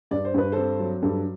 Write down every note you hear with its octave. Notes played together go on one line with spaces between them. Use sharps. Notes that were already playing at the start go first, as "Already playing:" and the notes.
G2 D5
C5
G2 B4
C4 A4 C5
F#3
G2 A4